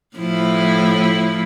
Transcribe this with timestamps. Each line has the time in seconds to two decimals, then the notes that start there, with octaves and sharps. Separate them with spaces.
0.17 A2 F3 E4